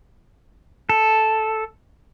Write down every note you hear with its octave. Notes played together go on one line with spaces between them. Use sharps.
A4